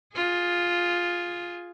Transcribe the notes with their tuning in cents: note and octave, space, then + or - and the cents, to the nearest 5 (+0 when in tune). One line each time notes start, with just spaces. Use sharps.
F4 +5 G#4 +0